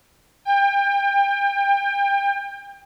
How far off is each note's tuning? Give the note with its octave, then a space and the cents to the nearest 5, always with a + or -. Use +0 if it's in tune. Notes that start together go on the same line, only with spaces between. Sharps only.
G5 +30